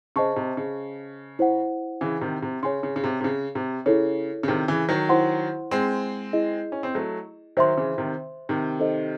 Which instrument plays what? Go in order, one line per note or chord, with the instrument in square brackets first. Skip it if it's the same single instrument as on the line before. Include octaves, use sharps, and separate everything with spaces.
[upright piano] C#3 [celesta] C5 D#5 A5 C#6
[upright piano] C3
C#3
[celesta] E4 C5 F#5
[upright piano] C#3 E3
C3 D#3
C3
[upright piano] C#3 [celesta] C#5 G#5 C6
[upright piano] C#3
C#3
C3
C3
C#3
C3
[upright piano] C#3 [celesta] E4 A4 C#5
[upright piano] C#3
C3 D#3
C#3 E3
D#3 F#3
[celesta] E4 C5 F#5 C6
[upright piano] G#3 C4
[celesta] E4 G#4 D#5
[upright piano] C#4
C4
F#3 A3
[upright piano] D#3 F#3 [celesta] C5 E5 C6
[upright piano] C#3 E3
C3 D#3
C3 D#3
[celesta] D#4 A4 C5 D#5